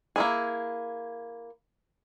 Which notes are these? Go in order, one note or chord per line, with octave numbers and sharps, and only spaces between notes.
A#3 E4 G#4